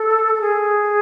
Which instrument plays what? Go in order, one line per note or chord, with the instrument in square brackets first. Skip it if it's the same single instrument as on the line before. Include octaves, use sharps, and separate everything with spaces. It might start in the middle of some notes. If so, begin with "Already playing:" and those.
Already playing: [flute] A4
A4
G#4